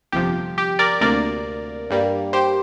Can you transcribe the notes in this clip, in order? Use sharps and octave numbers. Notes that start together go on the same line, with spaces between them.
G1 F2 C3 F3 G4
G4
A#4 D5
D2 C3 A#3 A#4 D5
G2 G3 A#3
G4 C5